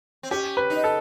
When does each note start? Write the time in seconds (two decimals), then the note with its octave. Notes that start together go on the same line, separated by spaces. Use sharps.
0.23 C4
0.31 C#4 G4
0.57 B4
0.70 D#4
0.84 A4